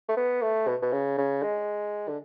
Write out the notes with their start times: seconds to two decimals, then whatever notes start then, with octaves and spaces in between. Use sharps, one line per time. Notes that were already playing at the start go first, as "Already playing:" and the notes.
0.09 A3
0.17 B3
0.42 A3
0.68 B2
0.82 B2
0.92 C#3
1.18 C#3
1.43 G#3
2.09 D3